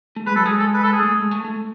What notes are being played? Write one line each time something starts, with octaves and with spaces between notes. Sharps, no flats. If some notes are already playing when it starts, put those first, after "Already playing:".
A3
G#3 B4
F#3 A4
G#3 G#4
A4
B4
A4
G#4
A3
G#3
A3
A3